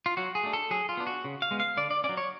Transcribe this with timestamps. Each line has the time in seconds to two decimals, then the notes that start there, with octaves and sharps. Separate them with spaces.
0.06 F4
0.17 F#3 F#4
0.35 G#4
0.43 A3 D4
0.53 A4
0.70 F#3 G#4
0.89 F4
0.97 B3 D4
1.07 F#4
1.24 C#3
1.42 F5
1.51 G#3 B3
1.60 F5
1.77 D3 D5
1.91 D5
2.04 C#4 D5
2.09 F#3
2.17 C#5